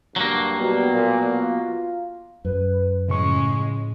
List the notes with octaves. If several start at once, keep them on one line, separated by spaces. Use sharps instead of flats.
G2 F#3 A#3
B2 G3
A#2
F4
F#2 B4
A2 C#3 F3 G#3 C#4 C#6